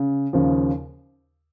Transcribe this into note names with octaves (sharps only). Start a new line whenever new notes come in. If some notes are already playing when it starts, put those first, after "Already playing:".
Already playing: C#3
D#2 C#3 F3